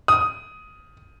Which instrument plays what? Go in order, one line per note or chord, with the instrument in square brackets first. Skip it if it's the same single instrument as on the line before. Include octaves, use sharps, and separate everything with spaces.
[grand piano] D#6